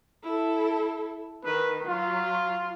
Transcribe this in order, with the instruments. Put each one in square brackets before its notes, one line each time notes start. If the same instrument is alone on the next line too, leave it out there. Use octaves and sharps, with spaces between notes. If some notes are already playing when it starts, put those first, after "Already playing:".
[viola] E4 A4
[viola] D#3 [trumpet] B4
[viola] F#3 [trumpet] F4